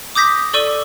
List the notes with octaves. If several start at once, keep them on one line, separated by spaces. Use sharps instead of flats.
D6 D#6 G6 A#6 B6
A4 D5 C#6 E6 D#7